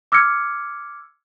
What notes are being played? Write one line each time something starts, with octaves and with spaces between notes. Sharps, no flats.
D6 E6 F6 G#6 C#7